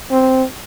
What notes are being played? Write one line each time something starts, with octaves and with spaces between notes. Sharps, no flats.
C4